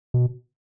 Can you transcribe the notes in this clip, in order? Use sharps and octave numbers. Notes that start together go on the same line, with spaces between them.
B2